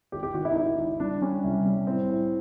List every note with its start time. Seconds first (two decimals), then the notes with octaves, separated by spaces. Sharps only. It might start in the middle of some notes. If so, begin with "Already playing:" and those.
0.12 G#1 G4
0.23 G4
0.34 D#3 F#4
0.45 E4
0.51 D#4
0.56 G#1 E4
0.78 G#1
1.00 G3 D4
1.22 G3 C#4
1.44 C2
1.65 G3
1.87 A2 C4
2.09 A2